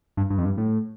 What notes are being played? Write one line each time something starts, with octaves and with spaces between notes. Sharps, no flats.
G2
G2
F2
G2
A2